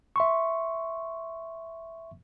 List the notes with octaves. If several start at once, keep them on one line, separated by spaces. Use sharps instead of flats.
E5 C6 C#6